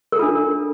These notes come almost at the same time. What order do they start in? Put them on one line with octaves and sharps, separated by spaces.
A#4 A4 F4 D4